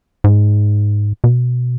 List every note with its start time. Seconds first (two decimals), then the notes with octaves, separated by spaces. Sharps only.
0.24 G#2
1.24 B2